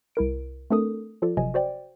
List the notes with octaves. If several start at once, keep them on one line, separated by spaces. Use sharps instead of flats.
C2 E4 A#4 D7
A3 C4 D4 A4 A#4 D#6
F3 F4 A4 D5
G1 C3 F3 F#3 D#5 G#5
F#4 C5 D5 G5